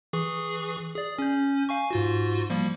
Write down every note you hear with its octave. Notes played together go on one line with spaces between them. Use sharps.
E3 G#4 C#6
G#4 D5
C#4 G6
F5 G#5 C#6
G#2 F4 F#4
F3 G3 A#3